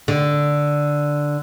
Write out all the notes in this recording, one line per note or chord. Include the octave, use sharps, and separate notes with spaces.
D3